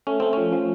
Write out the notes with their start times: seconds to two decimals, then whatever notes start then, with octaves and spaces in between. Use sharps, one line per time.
0.07 A3 C#4
0.20 A3 C4
0.33 F3 C#4
0.52 F3